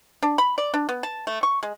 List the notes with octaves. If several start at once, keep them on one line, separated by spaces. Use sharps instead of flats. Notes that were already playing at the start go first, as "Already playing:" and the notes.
D4
B5
D5
D4
B3
A5
A3
C#6
G#3